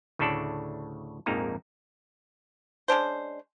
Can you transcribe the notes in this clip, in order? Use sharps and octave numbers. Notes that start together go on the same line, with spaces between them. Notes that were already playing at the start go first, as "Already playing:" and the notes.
D2 A2 C#3 D4 A4 D5
A#1 F2 G#2 A#3 D#4 A#5
G#3 C#4 D4 C5